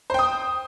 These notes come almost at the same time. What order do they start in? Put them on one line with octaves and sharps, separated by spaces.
C5 G5 D#6